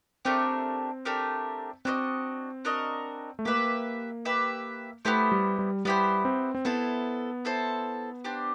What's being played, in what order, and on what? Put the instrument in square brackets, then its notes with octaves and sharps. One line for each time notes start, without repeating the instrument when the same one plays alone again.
[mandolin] A3 D4 G4 A#4 [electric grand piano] C4
[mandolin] A3 D4 G4 A#4
[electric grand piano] C4 [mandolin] D4 F#4 A#4 D#5
[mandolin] D4 F#4 A#4 D#5
[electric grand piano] A3
[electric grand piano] A#3 [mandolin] G4 B4 E5
[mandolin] G4 B4 E5
[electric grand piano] A3 [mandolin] B3 E4 G4 C5
[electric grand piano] G3
G3
[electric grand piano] G3 [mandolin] B3 E4 G4 C5
[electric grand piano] C4
C4
[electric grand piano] B3 [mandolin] E4 A4 C5
[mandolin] E4 A4 C5
D4 G4 C5